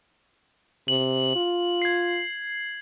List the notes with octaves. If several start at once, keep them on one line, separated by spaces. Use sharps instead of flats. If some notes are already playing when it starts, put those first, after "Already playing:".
C3 F#7
F4
G#6 C7